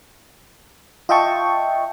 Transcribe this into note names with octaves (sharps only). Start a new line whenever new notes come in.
F4 D#5 E5 G5 A5 C#6